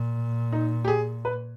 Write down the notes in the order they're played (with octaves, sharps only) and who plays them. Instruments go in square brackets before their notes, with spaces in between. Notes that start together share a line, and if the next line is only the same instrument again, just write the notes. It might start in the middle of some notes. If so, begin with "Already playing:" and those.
Already playing: [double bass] A#2
[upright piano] D#4
G4
G#4
B4